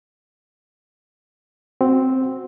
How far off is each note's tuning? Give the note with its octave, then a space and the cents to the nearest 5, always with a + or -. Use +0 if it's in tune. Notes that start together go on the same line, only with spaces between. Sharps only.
C4 +0 F#4 +0